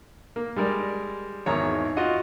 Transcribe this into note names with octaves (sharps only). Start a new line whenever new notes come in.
A#3
G3 G#3 A#4 D5
G#1 E2 D#3 C#5 A#5
F4 F#4 D#5 F#5